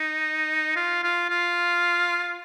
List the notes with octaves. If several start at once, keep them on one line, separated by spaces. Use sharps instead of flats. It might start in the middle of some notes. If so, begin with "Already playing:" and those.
Already playing: D#4
F4
F4
F4